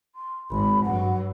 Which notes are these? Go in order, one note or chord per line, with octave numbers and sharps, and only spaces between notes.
C6
G#1 B5
G2 F#3 F#5